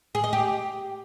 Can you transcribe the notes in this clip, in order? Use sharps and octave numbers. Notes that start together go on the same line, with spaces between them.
G#4
D#5
G4